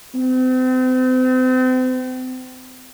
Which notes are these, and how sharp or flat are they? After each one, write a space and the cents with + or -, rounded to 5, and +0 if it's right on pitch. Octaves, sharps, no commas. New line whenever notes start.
C4 -35